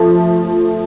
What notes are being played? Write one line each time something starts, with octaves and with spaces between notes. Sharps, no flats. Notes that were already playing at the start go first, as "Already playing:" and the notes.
Already playing: F3 A3